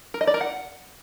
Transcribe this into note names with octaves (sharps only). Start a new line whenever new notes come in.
A#4
D#5
D5
A#4
F#5